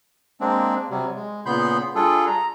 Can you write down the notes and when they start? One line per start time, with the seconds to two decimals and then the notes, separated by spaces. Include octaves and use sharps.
0.41 G#3 A#3 C4 D4
0.90 C3 F#3 G3
1.15 G#3
1.46 A#2 C#3 B3 B5 C6 G6
1.95 G3 D4 F4 G#4 A4
2.27 A#5